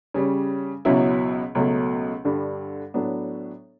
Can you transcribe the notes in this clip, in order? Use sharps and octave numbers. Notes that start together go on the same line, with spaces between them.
C#3 G3 C#4
C#2 B2 F#3 C#4 E4
C#2 B2 F#3 A3
G2 D3 G3 D4
A2 F#3 B3 D4